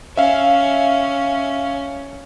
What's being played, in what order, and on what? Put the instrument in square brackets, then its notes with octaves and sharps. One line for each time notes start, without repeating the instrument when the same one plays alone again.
[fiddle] C#4 [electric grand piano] E5 F5